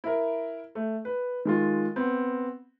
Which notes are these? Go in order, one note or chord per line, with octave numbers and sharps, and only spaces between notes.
E4 A#4
A3
B4
D#3 G#3 F4
B3 C4